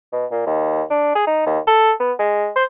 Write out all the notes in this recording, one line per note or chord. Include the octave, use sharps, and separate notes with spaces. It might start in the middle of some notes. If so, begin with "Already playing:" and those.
B2
A#2
D#2
D4
G#4
D#4
D#2
A4
B3
G#3
C5